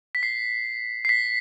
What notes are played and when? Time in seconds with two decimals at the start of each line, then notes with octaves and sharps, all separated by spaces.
0.15 B6
0.23 C7
1.05 C7
1.09 B6